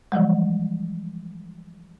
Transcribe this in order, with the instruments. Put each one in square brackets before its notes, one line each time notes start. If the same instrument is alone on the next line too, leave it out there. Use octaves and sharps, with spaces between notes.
[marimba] E3 F3 G3 G#3